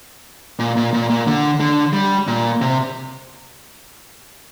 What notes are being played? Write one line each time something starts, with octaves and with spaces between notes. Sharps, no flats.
A#2
A#2
A#2
A#2
D3
D3
G3
A#2
C3